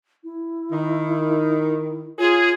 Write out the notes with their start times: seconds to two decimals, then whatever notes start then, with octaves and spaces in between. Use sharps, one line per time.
0.24 E4
0.72 D#3
2.19 F4 G#4 C#5